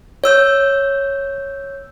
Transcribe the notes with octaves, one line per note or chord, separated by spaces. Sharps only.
C#5 E6 G6